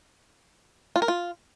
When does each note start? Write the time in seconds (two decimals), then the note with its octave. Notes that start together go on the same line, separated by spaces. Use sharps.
0.96 F4
1.02 A#4
1.08 F4